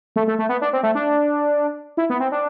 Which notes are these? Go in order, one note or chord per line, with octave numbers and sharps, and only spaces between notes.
A3
A3
A3
B3
D4
C4
A3
D4
E4
B3
C4
D4